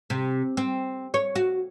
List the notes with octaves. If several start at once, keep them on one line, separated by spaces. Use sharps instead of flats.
C3
C4
C#5
F#4